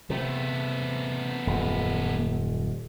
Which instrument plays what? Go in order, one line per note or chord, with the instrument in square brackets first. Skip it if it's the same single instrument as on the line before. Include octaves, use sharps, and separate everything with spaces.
[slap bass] C3 [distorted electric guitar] A3 B3
[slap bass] D#1 F#2